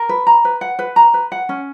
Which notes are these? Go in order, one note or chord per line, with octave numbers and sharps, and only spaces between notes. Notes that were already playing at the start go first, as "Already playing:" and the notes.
Already playing: A#4
B4
A#5
B4
F#5
B4
A#5
B4
F#5
C#4